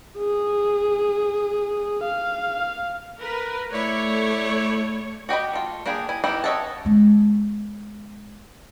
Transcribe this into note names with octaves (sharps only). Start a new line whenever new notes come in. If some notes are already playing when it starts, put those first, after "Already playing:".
G#4
F5
A#4 B4
A3 E4 C#5 D5
F#4 G4 D#5 B5
A3 F4
A#3 D4 G4 G#4 B5
E4 G#5
B3 D#4 E4 G4
C#5 D#5 E5 F#5 A5
G#3 B3